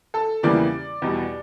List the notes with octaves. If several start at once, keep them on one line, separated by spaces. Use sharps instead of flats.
A4 A5
E2 C#3 E3 G3 A#3 D5 D6
E2 B2 G3